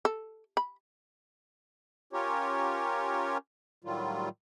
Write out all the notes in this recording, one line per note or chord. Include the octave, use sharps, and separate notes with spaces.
A4
B5
C#4 F4 G4 A#4 C#5
A2 D#3 F#3 G3 F4